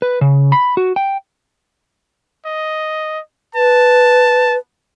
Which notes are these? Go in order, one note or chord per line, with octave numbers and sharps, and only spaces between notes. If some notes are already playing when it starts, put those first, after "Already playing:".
B4
C#3
B5
F#4
G5
D#5
B4 A5